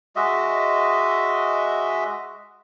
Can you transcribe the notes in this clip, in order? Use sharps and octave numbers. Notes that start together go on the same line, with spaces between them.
G#3 F#4 D#5 E5